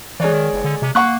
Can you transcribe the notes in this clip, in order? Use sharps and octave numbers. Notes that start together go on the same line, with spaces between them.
E3 G#3 C#5 D5
D#3
F#1
D3
C3
A#3 F#5 C#6 F#6